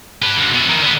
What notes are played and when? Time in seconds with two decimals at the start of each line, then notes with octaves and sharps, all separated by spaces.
0.22 G4 B4
0.36 F#2 D3
0.54 B2 E4
0.69 D#3 E3
0.82 D3 B3